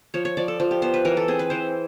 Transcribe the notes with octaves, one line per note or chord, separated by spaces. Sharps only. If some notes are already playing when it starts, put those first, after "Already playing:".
F3 C#5
C#5
F3 D5
A4
F3
G4
B3 C5
B4
E3 A#4
A4
C4 G#4
B4
E3 C5